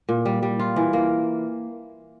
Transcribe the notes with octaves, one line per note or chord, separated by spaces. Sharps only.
A#2
G3
G3
F4
E3
A#3